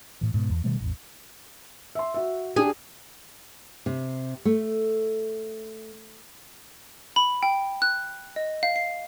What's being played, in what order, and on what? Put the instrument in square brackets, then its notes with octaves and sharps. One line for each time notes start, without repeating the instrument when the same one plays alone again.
[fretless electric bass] A2 E3
G#2 B2
E2
B2 D#3 G3 A3
A1 E2
[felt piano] E5 C6
F#4 E5
[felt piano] D4 G4 [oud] G#4
[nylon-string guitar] C3
A3
[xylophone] B5
G5
F#6
D#5
F5
C7